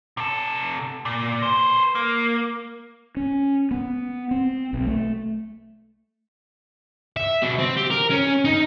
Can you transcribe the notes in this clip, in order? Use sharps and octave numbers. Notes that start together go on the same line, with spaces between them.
C3 A4
A#2
B4 C5
A#3
C#4
B3
C4
B1
A3
E5
B2
C4
G4
A#4
C#4
D#4